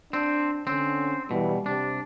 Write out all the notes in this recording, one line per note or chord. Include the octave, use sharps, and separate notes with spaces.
C4 D4
D3 C4 C#4
B2 E3 G3
C3 G3 D4